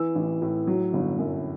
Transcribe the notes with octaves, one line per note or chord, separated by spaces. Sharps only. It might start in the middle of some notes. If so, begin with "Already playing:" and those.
Already playing: E3 E6
A1
A2
F#3
G1
F#2